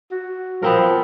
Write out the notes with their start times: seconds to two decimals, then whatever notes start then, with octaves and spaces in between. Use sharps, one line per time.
0.11 F#4
0.63 F3 B3 C4 A#4